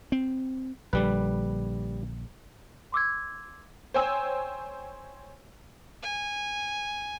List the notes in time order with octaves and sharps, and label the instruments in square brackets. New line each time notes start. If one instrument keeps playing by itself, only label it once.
[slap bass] C4
[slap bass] A#1 D3 [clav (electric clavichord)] G3 B4
[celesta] C6 D6 E6 G#6
[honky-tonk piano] C5 C#5 G5 G#5 E6
[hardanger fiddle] G#5